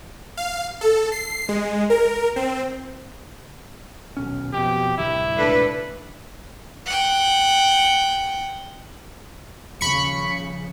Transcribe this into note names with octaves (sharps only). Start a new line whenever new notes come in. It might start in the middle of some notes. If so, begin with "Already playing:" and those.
F5
A4
C7
G#3
A#4
C4
D#1 B1 C#4
F2 B2 G4
D1 C2 G3 E4
E1 C#2 A2 D4 A4 B4
F#5 G5
D#1 C#3 F3 B5 C#6 C#7